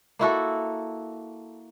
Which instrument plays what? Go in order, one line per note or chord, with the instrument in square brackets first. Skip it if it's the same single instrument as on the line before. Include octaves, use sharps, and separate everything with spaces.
[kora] A#3 E4 F#4 A4